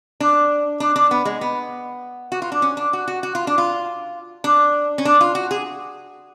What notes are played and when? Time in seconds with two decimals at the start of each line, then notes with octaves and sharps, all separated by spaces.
0.20 D4
0.80 D4
0.96 D4
1.11 B3
1.25 G#3
1.41 B3
2.32 F#4
2.42 F4
2.52 D4
2.62 C#4
2.77 D4
2.93 F#4
3.08 F#4
3.23 F#4
3.35 F4
3.47 D4
3.58 F4
4.44 D4
4.98 C#4
5.05 D4
5.21 F4
5.35 F#4
5.51 G#4